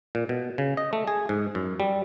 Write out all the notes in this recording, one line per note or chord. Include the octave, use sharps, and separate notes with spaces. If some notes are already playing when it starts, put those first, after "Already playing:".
A#2
B2
C#3
D#5
A3
G#4
G#2
F#2
G3